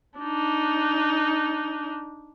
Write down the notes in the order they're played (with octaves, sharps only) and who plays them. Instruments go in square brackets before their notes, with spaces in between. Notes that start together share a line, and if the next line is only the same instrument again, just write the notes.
[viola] D4 D#4